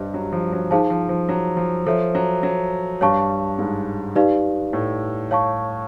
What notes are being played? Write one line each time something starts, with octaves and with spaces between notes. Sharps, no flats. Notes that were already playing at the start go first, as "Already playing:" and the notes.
Already playing: G2 G3 G4 C5 D#5
F#3
F3
F#3
F3 D#4 G#4 C5 F5 A5
F3
F3
F#3
F3
F3 A4 C#5 E5
F#3
F#3
G2 G3 C#5 F5 A5 C#6
G#2 G#3
D#4 G4 B4 D5 F5
A2 A3
C#5 F5 A5 C#6